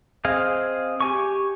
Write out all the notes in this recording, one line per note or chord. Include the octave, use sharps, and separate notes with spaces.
C4 G#4 D#5 F5
G4 G#5 C#6